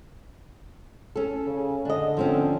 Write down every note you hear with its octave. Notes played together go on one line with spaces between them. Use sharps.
C#4 A4
C#3
D3 D4 D#5
F3 C4 C#4